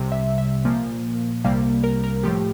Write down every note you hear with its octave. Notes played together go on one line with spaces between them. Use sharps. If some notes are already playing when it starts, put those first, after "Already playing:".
Already playing: C2 C3 G3
E5
E5
A#2 F3 A#3
C2 C3 G3 A#3 F5
A#4
A#4
A2 F3 A3 G4